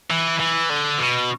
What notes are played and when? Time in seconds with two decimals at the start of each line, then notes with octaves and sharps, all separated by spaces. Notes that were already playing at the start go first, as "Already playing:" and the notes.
0.10 E3
0.39 E3
0.69 D3
0.98 B2